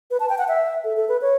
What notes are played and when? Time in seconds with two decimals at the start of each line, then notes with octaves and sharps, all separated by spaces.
0.11 B4
0.20 A5
0.29 G5
0.38 F#5
0.48 E5
0.84 A4
0.97 A4
1.09 B4
1.22 C#5